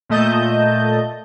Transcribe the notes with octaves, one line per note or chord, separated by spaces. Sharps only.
A#2 A3 D#5 A5 G6